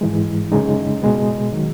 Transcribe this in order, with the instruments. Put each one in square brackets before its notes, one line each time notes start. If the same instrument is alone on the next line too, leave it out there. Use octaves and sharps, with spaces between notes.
[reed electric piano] G#2 E3 G#3
F#2 C#3 G#3 D#4
B2 G#3 B3
D#3 F#3